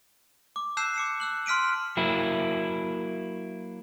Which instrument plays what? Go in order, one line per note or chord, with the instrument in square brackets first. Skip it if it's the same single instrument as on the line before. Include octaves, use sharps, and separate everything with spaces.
[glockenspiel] D6
A5 E6 F#6 G6 C7 E7
D6 C#7 E7
E6 F#6 F#7
C6 F6 B6 D7 D#7
[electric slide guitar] F#3 A#3 E4